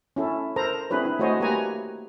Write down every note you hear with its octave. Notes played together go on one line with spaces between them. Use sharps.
C#4 E4 A4
A4 A#4 C5 A#5
C4 D4 E4 G#4 B4 C#5
E4
A3 F#4 C5 C#5 D#5 G#5
A#3 G4 B4 C#5 G#5 A#5